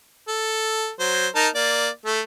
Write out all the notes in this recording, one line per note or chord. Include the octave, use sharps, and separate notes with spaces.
A4
F#3 C5
D#4 A#4 A5
A#3 D5
A3 A4